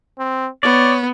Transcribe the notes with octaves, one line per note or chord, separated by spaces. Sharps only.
C4
B3 C#5 D5